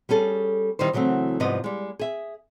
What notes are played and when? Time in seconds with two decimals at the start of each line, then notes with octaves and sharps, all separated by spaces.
0.09 G3 C#4 G#4 A4
0.79 D#3 G3 E4 C5
0.93 C#3 E3 F#3 A3 C4
1.40 G#2 C3 F3 G3 B3 D#5
1.64 G3 G#3
1.99 G#4 E5